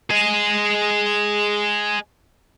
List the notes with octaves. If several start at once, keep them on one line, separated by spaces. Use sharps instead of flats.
G#4 D#5